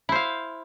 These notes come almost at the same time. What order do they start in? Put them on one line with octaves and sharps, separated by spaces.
E4 C5 F5